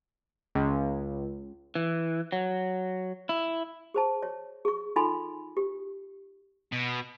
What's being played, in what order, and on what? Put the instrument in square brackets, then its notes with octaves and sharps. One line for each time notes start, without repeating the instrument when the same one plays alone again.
[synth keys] C#2
[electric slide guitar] E3
F#3
E4
[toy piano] G#4 C5 A5
C#5
G#4 C#6
D#4 F4 A4 G#5 B5 C6
G4
[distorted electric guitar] B2